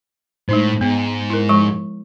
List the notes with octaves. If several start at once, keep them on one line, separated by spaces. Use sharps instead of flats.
A2 G#3 D#4 C5
G#2 B3
E4 A#4
F3 G#3 C#6